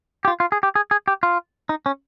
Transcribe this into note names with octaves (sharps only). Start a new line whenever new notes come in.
G4
F4
F4
G#4
G4
G#4
G#4
G4
F4
D#4
C#4